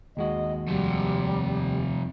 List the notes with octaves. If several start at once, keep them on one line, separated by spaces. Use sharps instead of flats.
D#2 G#3 F#4 D#5
F2 C3 G3